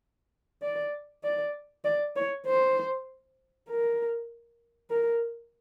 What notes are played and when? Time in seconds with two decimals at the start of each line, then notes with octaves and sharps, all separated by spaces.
0.63 D5
1.24 D5
1.84 D5
2.16 C#5
2.47 C5
3.69 A#4
4.90 A#4